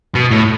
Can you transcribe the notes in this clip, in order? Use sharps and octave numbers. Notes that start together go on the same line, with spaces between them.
B2
A2